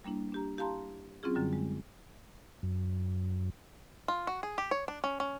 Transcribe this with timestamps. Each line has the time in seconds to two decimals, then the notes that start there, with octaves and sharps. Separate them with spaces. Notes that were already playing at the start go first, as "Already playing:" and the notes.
0.04 G3 A#3 D4 E4
0.32 D4 G4 A#5
0.58 E4 G4 F5 A5 A#5 C6
1.23 F#3 C4 C#4 E4 F4 G#4
1.35 F#2 D3 F#3 G3
1.53 G#3
2.63 F#2
4.08 F4
4.27 F#4
4.43 G#4
4.58 G4
4.71 C#5
4.88 D4
5.04 C#4
5.20 C#4